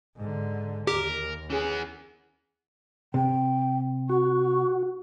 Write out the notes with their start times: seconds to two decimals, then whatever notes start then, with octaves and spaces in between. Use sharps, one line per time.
0.17 G#2 D3
0.87 D#2 G4 A#4
1.50 E3 B3 C#4 G#4
3.14 C3 G5
4.09 F#4 C#6